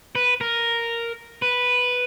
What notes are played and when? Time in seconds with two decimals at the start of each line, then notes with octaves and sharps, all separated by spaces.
0.15 B4
0.41 A#4
1.42 B4